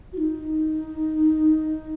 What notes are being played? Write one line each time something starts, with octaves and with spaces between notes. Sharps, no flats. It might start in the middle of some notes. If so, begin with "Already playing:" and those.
F#4
D#4